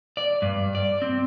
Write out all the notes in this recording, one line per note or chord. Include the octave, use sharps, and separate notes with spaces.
D5
G2
D5
C4